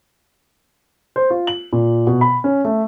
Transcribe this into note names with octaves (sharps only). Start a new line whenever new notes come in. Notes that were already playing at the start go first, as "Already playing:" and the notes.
C5
F4
F#7
A#2
B2
B5
C#4
A3